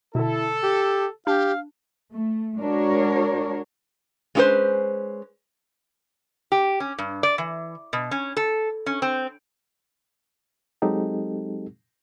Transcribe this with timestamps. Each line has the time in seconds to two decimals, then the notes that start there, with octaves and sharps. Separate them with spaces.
0.15 B2 D3 E4 A4
0.63 G4
1.27 D4 G4 F5
2.13 A3
2.60 G#3 D4 F#4 A#4 C#5
4.35 G#3 C#4 E4 G4 B4 C5
6.52 G4
6.80 C#4
6.98 G2
7.23 D5
7.38 E3
7.93 B2
8.11 C#4
8.37 A4
8.86 C#4
9.02 C4
10.82 F#3 G#3 C4 D#4 G4 A4